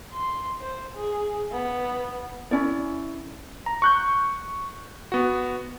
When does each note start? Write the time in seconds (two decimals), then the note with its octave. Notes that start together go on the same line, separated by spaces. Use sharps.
0.13 C6
0.61 C5
0.96 G#4
1.52 B3
2.51 C#4 E4 D5
3.66 A#5
3.82 C#6 F#6 G6
5.12 B3 F#4